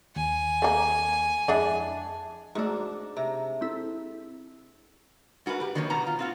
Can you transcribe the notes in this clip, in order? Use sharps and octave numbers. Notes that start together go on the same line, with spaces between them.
D#2 G#5
A3 A#3
F2 G#3 D4 E4 A5
G#2 A3 D4 F#4 A#5
C3 A#5
C4 E4 A4
G#2 F#4 A#4 B4 F#5
G4 B4
D#3 F#3 A#3 D#4 C#5
G#2 B2 B3 F#4 A#5
F4
C4 F4 F#4